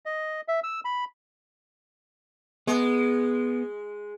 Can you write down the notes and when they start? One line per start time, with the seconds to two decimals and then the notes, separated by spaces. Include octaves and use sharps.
0.05 D#5
0.48 E5
0.64 E6
0.85 B5
2.67 G#3 B3